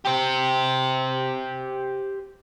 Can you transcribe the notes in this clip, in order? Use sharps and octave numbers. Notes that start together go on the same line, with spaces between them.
G4 C5